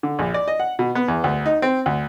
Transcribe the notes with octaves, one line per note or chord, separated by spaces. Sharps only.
D3
A#1
D5
D#5
F#5
B2
B3
E2
D2
D#4
C4
D2